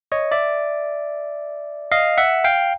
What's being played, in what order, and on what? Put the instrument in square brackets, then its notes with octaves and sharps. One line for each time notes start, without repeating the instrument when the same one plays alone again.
[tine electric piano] C#5 D#5
D5 E5
D#5 F5
E5 F#5
F5 G5